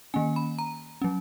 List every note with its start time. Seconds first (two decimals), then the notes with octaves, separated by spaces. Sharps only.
0.14 D#3 A#3 C#4 G#5
0.36 B5
0.59 A#5
1.02 F#3 C#4